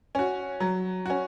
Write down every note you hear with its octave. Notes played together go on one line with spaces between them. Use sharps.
C#4 F#4
F#3
C#4 F#4